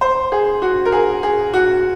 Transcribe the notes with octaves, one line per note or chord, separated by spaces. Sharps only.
C5
G#4
F#4
A#4
G#4
G#4
F#4